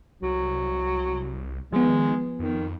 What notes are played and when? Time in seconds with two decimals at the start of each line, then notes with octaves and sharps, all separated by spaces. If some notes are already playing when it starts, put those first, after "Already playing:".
0.22 C2 F#3
1.73 D#3 F3 G#3 B3
2.39 F2 D#3